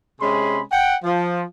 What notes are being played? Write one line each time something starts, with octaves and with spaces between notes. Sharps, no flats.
C3 G#3 C#4 G#4 B5 C6
F#5 G5
F3